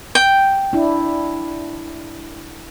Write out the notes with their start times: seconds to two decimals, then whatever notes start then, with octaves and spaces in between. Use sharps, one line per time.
0.15 G5
0.73 D4 E4